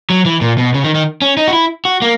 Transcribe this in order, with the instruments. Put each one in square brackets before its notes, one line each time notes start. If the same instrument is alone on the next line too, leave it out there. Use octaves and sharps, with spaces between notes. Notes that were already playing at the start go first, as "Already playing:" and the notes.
[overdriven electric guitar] F#3
E3
A#2
B2
C#3
D#3
D#3
C#4
D#4
F#4
E4
F#4
A#3